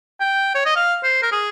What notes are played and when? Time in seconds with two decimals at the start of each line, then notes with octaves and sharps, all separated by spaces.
0.20 G5
0.55 C#5
0.65 D#5
0.76 F5
1.04 C5
1.22 A#4
1.32 G#4